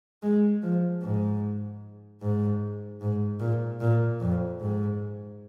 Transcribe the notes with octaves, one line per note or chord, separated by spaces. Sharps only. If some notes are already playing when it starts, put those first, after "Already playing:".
G#3
F3
G#2
G#2
G#2
A#2
A#2
F2
G#2